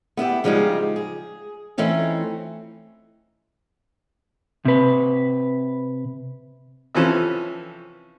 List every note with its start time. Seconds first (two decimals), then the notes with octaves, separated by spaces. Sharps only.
0.17 B3 E4 F4 G4
0.44 C#3 F3 G3 G#3 D#4 G4
0.96 G#4
1.78 E3 A3 C4 C#4 D#4
4.65 C3 B4
6.95 C3 E3 F3 C#4 A4 B4